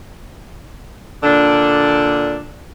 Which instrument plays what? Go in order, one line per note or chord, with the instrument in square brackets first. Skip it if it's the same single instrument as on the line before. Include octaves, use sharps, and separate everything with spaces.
[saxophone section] A#2 D3 D4